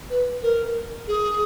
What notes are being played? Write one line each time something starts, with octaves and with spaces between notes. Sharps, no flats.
B4
A#4
G#4